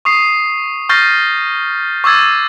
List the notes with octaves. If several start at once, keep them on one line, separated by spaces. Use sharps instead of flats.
C#6 D#6 C7
C#6 F6 G6 A6 A#6 C7
C#6 D6 E6 G#6 A6